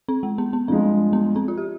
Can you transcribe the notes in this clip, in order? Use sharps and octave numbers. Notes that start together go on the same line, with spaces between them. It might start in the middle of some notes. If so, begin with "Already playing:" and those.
C4
G#3
B3
B3
G2 F3 G#3 C4
B3
C4
F4
G4